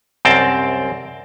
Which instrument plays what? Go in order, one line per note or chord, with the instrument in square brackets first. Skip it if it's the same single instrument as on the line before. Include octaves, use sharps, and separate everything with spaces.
[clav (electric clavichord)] C2 F#2 C4 A#4 G5 A5